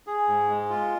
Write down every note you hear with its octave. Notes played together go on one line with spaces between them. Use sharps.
G#4
G#2
G#3
F4